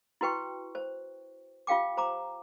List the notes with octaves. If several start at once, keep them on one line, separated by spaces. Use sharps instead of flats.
E4 F#4 B4 G5 C#6
C5
F4 G4 F5 G5 D6
C5 A#5 D6